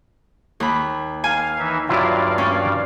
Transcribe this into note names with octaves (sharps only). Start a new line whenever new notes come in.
D#2 B5
F5 G#5
E3 D#4 E5
G2 F#3 E4 F4 D5 F5
C#4